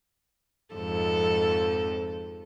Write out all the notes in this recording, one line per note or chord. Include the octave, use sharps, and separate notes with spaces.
F2 G#2 A4